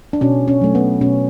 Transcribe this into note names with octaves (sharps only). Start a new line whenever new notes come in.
D4
B2 C#4
C#4
F#3 A3
B3
B2 C#4